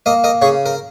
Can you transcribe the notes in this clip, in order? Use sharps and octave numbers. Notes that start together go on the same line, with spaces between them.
A#3 A#4 D#5
A#4 D#5
C#3 G#4 C#5
A#4